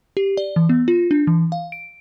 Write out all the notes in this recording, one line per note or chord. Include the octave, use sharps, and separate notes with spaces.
G4
D5
E3
B3
F4
D4
E3
F5
D7